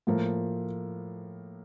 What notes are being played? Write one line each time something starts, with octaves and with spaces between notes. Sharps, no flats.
A2 F3 A#3